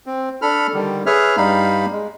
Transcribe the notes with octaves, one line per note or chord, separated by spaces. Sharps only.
C4
D4 A4 B5 F6
D3 D#3 G3
G#4 B4 C#5 E5 F6
G2 G3 D#4 F5 B5
G#3